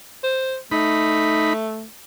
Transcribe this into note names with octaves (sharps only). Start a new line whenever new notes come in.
C5
A3 D#4 B5